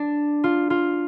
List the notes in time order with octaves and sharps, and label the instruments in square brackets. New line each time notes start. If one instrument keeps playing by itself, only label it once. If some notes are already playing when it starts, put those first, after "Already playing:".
Already playing: [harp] D4
F4
F4